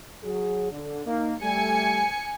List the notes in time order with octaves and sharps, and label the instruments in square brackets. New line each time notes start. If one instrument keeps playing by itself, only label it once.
[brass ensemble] F#3 G#4
D3
A#3 D#4
[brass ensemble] G3 A3 [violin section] G#5 C#7